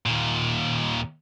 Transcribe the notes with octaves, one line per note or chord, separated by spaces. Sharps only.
D#2 A#2